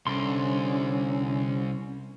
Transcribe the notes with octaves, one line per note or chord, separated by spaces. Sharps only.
C2 D3 C#4 C6